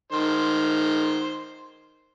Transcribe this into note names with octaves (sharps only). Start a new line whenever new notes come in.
D#3 C5